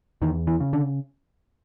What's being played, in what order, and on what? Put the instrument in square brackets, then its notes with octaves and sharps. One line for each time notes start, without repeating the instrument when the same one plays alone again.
[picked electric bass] E2 D#3
E3
C#3
D3